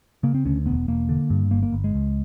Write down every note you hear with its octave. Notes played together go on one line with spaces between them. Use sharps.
C#3 A#3
C4
D2 C#4
E1 B3
E1 A#3
D3
G2
G1 A#3
A#3
G1
G#3
C#2